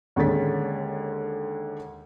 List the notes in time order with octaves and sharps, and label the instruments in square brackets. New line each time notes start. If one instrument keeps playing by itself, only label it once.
[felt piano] D#2 D3 G#3 C#4 A6 B6